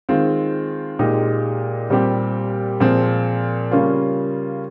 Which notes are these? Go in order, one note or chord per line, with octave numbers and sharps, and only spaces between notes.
D#3 G#3 C4 F4
A#2 G#3 D#4 G4
A#2 G3 C4 G4
A#2 F3 G#3 C4
C#3 G3 A#3 C#4 F4